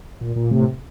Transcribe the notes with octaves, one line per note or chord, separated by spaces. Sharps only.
A#2
A#2
A2 C3